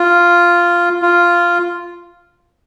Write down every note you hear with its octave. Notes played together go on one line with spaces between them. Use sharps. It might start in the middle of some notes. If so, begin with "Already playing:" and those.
Already playing: F4
F4